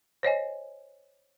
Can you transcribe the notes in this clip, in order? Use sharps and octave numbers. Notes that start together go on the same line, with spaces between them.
C5 C#5 D#5 G#5